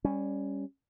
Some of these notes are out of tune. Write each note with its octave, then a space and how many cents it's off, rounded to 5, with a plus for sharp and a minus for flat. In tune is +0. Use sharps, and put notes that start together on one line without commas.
G3 +20 C#4 +0